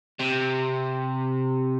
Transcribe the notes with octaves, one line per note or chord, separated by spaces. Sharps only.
C3